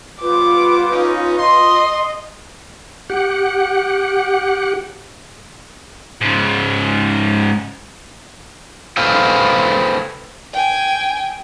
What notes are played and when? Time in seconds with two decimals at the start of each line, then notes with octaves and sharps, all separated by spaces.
0.21 G3 B3 F4 B4 C5 D6
0.91 C#4 D#4
1.39 D#5 C6
3.10 G4 F#5
6.21 G#2 C#3
8.97 A4 B4 C5 F5 G5 G#5
10.53 G5 G#5